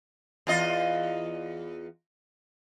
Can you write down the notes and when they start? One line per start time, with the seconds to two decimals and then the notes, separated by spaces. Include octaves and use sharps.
0.47 E2 F4 D#5